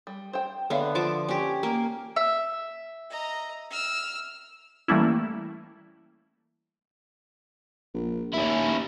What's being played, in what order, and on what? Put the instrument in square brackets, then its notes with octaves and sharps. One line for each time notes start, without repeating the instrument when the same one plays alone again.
[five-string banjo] G3
C5 G5
[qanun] D3 B3 [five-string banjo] C#5 E5 F5
[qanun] F3 A5 D6 [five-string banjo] F4
[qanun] C#4 G4
A#3
[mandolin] E5
[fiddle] D#5 A#5
E6 F6
[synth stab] E3 G3 A3 A#3 C#4 E4
[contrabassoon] A#1
[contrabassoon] D#2 [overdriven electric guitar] C#4 E4